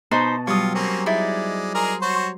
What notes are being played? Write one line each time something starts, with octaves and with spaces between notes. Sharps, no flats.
B2 D#4 C5 A5 B5
F#3 G3 F4 C#5 D#6
A#3 C4 C#4 C5
G#3 D#4 E4 D5
G#4 A#4 A#5 C6
F#4 C5 C#5